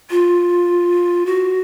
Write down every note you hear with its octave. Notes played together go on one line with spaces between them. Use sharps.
F4
F#4